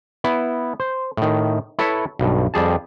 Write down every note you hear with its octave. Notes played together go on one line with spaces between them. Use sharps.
B3 E4
C5
A2 D#3
E4 A4 B4 C#5 E5
B1 G2
F2 G3 G#4 A5